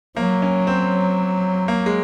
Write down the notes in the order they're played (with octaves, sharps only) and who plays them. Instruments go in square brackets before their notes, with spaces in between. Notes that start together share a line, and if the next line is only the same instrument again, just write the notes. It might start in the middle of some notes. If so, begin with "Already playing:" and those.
[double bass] F#3 [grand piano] A#3
[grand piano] C#4
C4
A#3
G#3